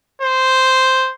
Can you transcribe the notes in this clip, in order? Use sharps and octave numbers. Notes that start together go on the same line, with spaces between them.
C5